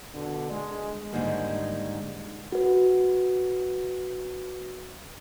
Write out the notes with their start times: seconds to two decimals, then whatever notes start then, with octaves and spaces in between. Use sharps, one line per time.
0.15 B2 D3
0.51 G#3
1.13 G#2 D3 D#3 G3 G#3 A#3
2.52 F#4 B4